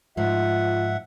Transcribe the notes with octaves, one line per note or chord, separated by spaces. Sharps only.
G#2 F3 F4 E5 F#5